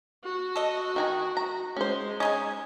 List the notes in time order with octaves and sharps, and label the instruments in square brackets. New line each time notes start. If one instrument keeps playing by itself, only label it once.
[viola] F#4
[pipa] A4 D#5
[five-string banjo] D#3 G#5 A#5
A#5
[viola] G#3 [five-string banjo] C#4 C5
[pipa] C#4 D#4 G#5 [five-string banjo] D#5